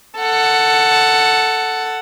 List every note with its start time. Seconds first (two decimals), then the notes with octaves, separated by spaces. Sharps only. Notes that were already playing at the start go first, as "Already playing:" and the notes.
0.19 A4 F#5